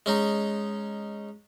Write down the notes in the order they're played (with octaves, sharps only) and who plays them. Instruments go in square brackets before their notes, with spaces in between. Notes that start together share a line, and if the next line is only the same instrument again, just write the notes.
[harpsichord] G#3 C#4 D#4